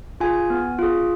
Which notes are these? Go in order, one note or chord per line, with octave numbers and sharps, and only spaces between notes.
F4 G#4 G#5
B3
F4 G#4